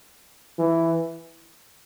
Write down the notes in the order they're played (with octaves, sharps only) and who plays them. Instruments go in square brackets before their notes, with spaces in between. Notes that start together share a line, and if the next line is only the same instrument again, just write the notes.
[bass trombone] E3